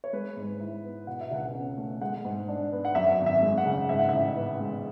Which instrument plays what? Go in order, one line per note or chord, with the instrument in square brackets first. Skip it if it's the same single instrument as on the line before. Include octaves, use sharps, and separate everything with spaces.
[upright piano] C#5
G#3 B4
G#2
E4
B3
B2 F#5
E5
C#2 F#5
C#4
A3
G#3 F#5
G#2
D4
B3
F#5
F#2 E5
G#1
E5
G#3
F#5
C#3
G#2 E5
F#5
A1 E5
B3
G#3